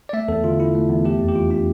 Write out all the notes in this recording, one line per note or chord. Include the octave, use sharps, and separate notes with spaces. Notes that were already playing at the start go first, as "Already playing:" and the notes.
D5
A3 E5
E2 A4
D3 F4
E4
A3
E2
A3 G4
F2
G4
E3 F4
D4 G4